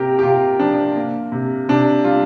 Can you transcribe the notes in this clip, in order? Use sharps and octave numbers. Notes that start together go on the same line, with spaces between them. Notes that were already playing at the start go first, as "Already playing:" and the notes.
Already playing: C3 A#3 G4 A#4
G4
C3 F4
F3 D4
A#3
C3
C3 D4
G3 F4